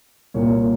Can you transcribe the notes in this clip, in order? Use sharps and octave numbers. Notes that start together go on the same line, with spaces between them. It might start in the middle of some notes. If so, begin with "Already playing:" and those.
C2 A#2 C#5